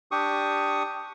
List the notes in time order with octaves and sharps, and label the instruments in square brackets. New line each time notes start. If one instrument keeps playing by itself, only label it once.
[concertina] D4 G4 C#6 D#6